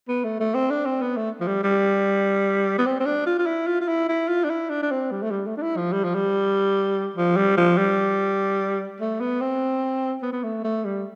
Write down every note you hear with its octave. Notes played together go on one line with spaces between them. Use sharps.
B3
A3
A3
C4
D4
C4
B3
A3
F3
G3
G3
B3
C4
C4
D4
F4
F4
E4
F4
F4
E4
E4
F4
D4
E4
D4
D4
C4
G3
A3
G3
A3
D4
E4
F3
G3
F3
G3
F3
G3
F3
G3
A3
B3
C4
B3
B3
A3
A3
G3